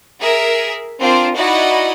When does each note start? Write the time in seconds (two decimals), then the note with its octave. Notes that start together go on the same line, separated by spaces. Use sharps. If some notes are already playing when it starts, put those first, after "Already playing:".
0.21 G#4 A#4 E5
1.00 C4 D4 F4 A#4 C5
1.35 D#4 E4 F#4 D5 D#5 F#5